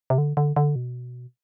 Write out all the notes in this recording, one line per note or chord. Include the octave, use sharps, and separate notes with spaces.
C3
D3
D3
D3
B2